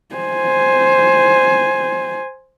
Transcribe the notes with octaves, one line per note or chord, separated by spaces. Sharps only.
C5 G#5